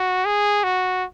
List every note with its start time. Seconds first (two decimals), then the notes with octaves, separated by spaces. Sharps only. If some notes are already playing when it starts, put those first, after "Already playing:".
Already playing: F#4
0.25 G#4
0.64 F#4